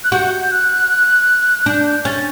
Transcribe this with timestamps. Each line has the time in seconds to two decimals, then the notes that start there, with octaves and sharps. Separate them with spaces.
0.03 F#6
0.12 F#4 G6
0.51 F#6
1.66 D4 G6
1.86 G6
2.05 C#4 A6